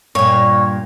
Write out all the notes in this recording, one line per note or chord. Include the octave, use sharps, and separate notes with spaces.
G2 A#2 C#5